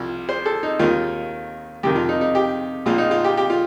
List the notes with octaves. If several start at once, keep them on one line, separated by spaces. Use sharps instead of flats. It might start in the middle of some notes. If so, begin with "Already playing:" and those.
Already playing: C2 C3 F3
C5
A4
D#4
D#2 D#3 F4
F2 C3 D#3 G4
F4
D#4
D#4
G4
A#1 A#2 F3 F4
D#4
F4
G4
G4
F4